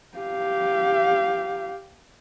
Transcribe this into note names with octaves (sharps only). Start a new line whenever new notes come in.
G4 F5